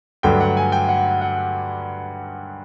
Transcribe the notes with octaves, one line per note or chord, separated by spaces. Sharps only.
G2 D3 F#3 A3 G5
F#5
G#5
G5
F#5
F#5